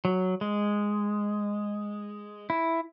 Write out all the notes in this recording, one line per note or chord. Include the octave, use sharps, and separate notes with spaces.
F#3
G#3
E4